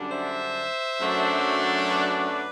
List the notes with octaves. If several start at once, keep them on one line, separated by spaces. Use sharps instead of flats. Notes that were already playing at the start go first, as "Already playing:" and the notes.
Already playing: F#2 D3 G3 D4
C5 E5
F#2 F#3 A3 D4
B4 D5